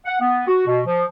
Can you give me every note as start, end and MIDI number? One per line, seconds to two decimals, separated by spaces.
0.05 0.17 78
0.20 0.46 59
0.47 0.66 66
0.67 0.80 47
0.87 1.05 53